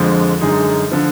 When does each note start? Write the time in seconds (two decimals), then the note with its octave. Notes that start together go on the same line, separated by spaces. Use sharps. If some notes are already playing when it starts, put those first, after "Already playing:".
Already playing: F2 D3 F3 G#3
0.41 F#2 D3 G#3 D#4 G#4
0.92 D3 F3